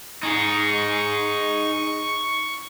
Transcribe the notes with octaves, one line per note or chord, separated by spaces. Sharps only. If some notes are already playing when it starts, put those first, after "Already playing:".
D#4 G#4 C#6